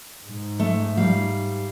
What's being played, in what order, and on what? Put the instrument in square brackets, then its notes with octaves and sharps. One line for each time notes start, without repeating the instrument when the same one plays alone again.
[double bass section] G#2
[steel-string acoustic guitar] A3
G3 F5